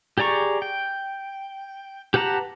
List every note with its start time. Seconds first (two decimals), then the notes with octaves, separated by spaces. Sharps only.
0.18 G4 G#4 D5 A#5 C#6
0.62 G5
2.14 G4 B4 F#5 A5 A#5